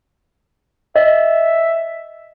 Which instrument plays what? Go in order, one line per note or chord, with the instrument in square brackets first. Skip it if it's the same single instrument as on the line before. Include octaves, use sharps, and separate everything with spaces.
[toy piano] D#5 [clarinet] E5